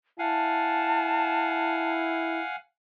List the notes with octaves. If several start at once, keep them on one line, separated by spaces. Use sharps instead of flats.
E4 F5 F#5 G#5 A5